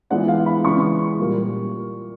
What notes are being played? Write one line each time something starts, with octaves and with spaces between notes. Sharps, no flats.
E3 G#3 B3 D4 F4 F#5
F5
B5
C#3 E3 G#3 C#6
A#2 G3 A#3